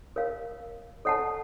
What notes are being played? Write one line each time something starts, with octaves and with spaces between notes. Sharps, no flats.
A#4 C#5 F5
A4 C#5 F#5 A5